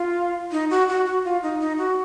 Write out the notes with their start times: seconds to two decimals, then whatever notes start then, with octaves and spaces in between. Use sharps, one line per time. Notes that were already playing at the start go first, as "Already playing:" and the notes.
Already playing: F4
0.52 D#4
0.70 F#4
0.89 F#4
1.06 F#4
1.25 F4
1.42 D#4
1.60 D#4
1.78 F#4